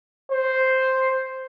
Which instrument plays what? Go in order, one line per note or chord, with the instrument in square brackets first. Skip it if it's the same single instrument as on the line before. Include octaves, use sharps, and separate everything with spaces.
[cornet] C5